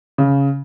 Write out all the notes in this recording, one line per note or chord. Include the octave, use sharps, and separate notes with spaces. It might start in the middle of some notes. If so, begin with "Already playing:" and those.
C#3